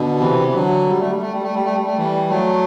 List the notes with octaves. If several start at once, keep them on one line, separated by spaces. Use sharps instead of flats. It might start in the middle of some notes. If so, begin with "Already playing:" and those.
Already playing: B2 D3
C3 E3
E3
D3 F#3
G3
A3
G3
A3
G3
A3
G3
A3
G3
A3
E3 G3
F#3 A3